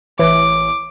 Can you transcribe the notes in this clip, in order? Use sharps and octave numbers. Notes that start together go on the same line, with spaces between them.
A1 E3 C#5 D6